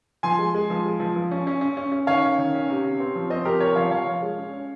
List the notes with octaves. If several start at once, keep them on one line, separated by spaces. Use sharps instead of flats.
F3 G#5 C6
G#3
G#3
F3
G#3
F3
F3
C#4
C#4
C#4
C#4
C#4
D#3 C#5 F5
C#4
D#3
C#4
C3
C3
C4
F3
C4 C5 D#5
F3 G4 A#4
C3 A#4 C#5
F3 C#5 F5
F3 C#5 F5
F3
G#3
C#4
C#4